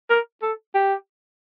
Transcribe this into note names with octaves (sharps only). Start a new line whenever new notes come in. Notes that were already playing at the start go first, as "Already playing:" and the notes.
A#4
A4
G4